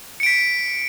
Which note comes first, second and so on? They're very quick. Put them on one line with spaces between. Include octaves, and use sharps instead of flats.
C#7 D7 B6